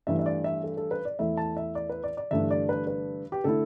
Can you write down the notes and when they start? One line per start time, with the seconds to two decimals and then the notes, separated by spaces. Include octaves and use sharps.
0.07 G2 E3 A3 E5
0.19 E5
0.26 D5
0.44 E5
0.64 A4
0.77 A4
0.91 B4
1.05 D5
1.19 E2 E3 A3 E4 E5
1.37 A5
1.57 E5
1.75 D5
1.89 B4
2.04 D5
2.17 D5
2.31 G1 G2 E3 A3 D4 E5
2.51 D5
2.69 B4
2.87 B4
3.32 G4
3.44 D3 A3 E4 A4